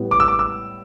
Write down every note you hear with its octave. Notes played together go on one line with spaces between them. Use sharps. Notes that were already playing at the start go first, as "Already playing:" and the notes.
Already playing: A2 G3 B3
D6
E6
D6
E6